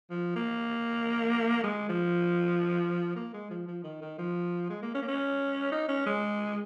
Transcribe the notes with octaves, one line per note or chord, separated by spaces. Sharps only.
F3
A#3
G#3
F3
A#3
G#3
F3
F3
D#3
D#3
F3
G#3
A#3
C#4
A#3
C#4
D#4
C#4
G#3